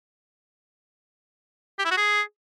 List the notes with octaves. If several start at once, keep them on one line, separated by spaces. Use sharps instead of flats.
G4
E4
F#4
G#4